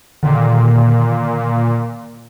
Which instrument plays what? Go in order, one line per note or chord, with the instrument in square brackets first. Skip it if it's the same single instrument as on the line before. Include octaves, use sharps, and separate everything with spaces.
[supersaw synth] A#2 [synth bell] D3 D#3